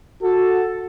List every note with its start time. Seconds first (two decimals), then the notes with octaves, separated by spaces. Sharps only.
0.22 F#4 A4